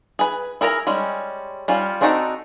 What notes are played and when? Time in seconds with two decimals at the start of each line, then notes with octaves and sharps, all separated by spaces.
0.19 G#4 B4
0.61 E4 G#4 A#4 G#5 A#5
0.87 G3 G#3 C#4
1.68 G3 C#4 F4
2.01 C4 D4 D#4 F#4 A4